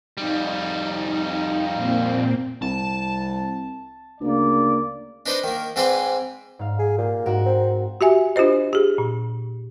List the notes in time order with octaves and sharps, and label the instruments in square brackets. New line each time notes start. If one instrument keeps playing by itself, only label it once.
[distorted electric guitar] F2 G3 [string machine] D#4
[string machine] A#2 C4
[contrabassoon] C2 [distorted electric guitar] A5
[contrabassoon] D2 [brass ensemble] C#3 A#3 D5
[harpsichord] D4 D#4 B4 C5 D5 D#5
D#3 A#3
G#2 C4 B4 D5 G#5 C6
[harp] G#2 F5
[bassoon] G#4
[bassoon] A#2 [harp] G4
[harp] G#2 F#5 E7 [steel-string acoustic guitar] F#4 A#4
[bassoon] C4
[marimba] F#4 G4 E5 G#5
D4 F4 G4 C5 D#5
G4 G#4
A#2